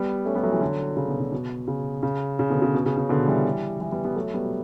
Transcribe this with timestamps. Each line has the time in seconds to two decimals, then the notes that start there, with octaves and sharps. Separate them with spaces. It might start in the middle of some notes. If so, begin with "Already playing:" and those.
Already playing: G3 B3
0.25 A3 C#4
0.35 G3 B3
0.43 F#3 A3
0.52 E3 G3
0.61 D3 F#3
0.97 C#3
1.08 B2
1.20 C#3
1.32 B2
1.68 C#3
2.03 C#3
2.39 C#3
2.50 B2 D3
2.62 C#3
2.75 B2
2.86 C#3
2.97 C#3
3.09 B2 D3
3.28 E3 G3
3.80 E3 G3
3.92 G3 B3
4.04 G3 B3
4.16 F#3 A3
4.34 G3 B3